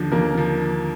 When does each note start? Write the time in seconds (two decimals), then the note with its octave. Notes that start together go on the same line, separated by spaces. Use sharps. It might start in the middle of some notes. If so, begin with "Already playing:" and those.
Already playing: D#2 D3 F3
0.11 D#2 A#3 A#4
0.35 D3 F3